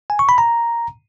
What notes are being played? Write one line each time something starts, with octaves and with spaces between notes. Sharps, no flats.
G#5
C#6
B5
A#5